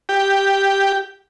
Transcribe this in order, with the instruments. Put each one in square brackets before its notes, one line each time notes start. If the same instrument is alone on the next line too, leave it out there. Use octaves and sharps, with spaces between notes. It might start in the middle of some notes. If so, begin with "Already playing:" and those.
[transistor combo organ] G4